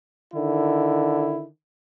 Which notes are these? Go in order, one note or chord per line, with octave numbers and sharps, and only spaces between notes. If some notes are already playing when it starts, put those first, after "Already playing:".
D3 D#3 E4